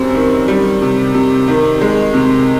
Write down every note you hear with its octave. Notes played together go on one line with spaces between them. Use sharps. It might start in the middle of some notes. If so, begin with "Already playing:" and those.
Already playing: F#2 G3 C4
D#3
G3
C3
C3
D#3
G#3
C3